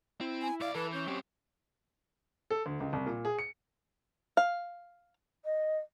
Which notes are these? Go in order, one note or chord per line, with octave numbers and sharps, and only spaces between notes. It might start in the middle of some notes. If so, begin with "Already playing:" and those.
C4 E4
G#5
C2 D5 F5
E3 A4 B4
C#4 G6
F#3 C4 G4
A4
D2
C#2
C2
A#2
G#4
C#7
F5
D#5